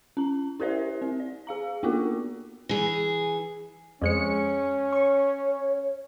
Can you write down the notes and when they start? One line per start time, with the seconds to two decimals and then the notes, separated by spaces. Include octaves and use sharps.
0.17 C#4 A#5
0.60 E4 G4 A#4 C5 D5 E5
1.02 C4
1.20 D5
1.47 G#4 F5 A#5
1.83 A#3 B3 F4 F#4 A#4
2.69 E3 G#4
4.01 F2 G#3 C#4 C#7
4.93 C#5 C#6